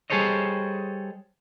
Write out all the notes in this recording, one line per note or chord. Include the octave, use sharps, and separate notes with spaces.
G3 G#4 A4 C5 C#5 D#5